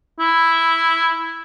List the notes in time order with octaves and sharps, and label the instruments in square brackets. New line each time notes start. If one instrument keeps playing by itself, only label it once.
[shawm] E4